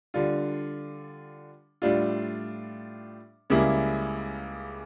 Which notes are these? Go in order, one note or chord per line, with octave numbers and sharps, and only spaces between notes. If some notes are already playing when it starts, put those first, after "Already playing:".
D3 G3 D4 F4
A2 G3 D4 F4
C#2 C#3 G3 A#3 E4